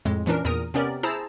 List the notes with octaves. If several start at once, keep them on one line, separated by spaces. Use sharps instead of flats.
F2 A2 G#3
A#2 E3 C#4 D4 A#4
E2 A#2 A#4 A#5 D#6
C3 B3 C#4 G4 A#4 D5
E4 G#4 C5 A5 A#5 E6